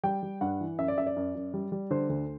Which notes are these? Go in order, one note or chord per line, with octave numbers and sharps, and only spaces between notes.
G3 G5
G3
G2 F#5
E3
F#2 E5
D5
F#2 E5
D5
F#2
F#2
G3
G3
D3 C5
D2